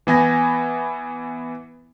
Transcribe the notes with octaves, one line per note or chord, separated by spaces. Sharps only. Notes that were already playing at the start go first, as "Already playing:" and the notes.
E3 B3 G#5 A#6